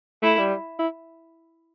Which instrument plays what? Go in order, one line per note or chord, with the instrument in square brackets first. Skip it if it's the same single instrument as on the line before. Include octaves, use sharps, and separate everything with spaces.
[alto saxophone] A3 [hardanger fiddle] E4
[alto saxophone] G3
E4